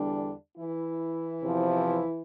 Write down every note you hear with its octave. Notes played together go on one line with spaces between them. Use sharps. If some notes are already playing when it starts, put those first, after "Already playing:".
Already playing: E2 D3 G3 D4
E3 E4
E2 C3 F3